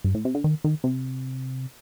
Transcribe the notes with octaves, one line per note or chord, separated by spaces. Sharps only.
G2
A2
C3
D3
D#3
D#3
C3